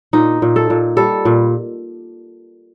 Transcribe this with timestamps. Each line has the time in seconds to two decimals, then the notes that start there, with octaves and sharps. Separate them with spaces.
0.13 A#2 D#4
0.42 A#2
0.56 A4
0.70 A#2
0.97 G3 A4
1.25 A#2